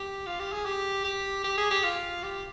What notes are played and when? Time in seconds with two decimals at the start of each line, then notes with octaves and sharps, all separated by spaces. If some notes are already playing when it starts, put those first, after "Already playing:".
Already playing: G4
0.26 F4
0.39 G4
0.52 G#4
0.65 G4
1.04 G4
1.44 G4
1.57 G#4
1.71 G4
1.83 F4
2.23 G4